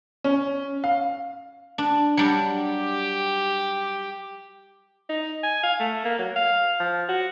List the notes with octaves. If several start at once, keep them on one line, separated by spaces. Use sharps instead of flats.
C#4
F5
D4
F#3 G3 D4
G4
D#4
G#5
F5
A3
A#3
F#3
F5
F3
F#4